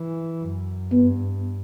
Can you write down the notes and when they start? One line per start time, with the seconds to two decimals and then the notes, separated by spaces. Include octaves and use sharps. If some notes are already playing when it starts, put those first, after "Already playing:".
Already playing: E3
0.42 F#2
0.91 G2 B3